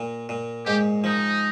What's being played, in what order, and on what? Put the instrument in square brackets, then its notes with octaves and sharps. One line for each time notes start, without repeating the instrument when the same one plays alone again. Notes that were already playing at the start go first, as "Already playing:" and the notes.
Already playing: [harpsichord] A#2
A#2
[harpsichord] G#2 [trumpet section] G4
[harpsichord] F3 [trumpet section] D#4